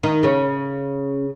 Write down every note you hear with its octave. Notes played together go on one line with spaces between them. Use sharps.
D#3 D#4
C#3 C#4